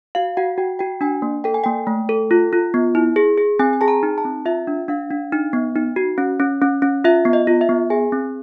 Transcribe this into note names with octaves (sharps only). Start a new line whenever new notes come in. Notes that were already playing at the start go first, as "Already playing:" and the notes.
F#4 F5
F#4 F#5
F#4 G5
F#4 G5
D4 G#5
A#3
A4 G5
G#5
A#3 G5
A3
A4
F4
F4
B3
E4
G#4
G#4
C4 G#5
G#5
G#4 A5
A#5
D#4
A5
C4
F4 E5
D4
D4 F5
D4
D#4
B3
D#4
F#4
C#4
C#4
C#4
C#4
F4 E5
B3
D#5
F4
E5
B3
G#4 G#5
C4